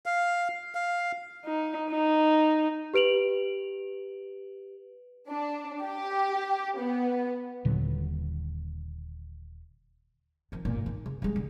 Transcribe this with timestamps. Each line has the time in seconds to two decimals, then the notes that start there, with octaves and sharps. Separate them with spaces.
0.06 F5
0.75 F5
1.45 D#4
1.91 D#4
2.94 G4 B4 D7 F7 F#7
5.28 D4
5.83 G4
6.78 B3
7.65 D#1 A#2 D3 F#3
10.52 D#3 F3
10.65 G1 A#2
10.86 D#3
11.06 C#3
11.22 G3 G#3
11.36 D3